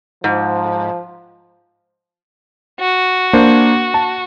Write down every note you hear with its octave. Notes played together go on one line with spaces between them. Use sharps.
G#2 F3
F#4
A#3 D4 C5
A5